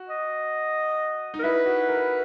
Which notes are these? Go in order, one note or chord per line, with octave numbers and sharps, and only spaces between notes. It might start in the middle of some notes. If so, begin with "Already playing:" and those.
Already playing: F#4
D#5
D#4
A#4
E4 B4
F#4
A#4